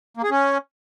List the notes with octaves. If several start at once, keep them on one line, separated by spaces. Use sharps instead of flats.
A#3
G#4
C#4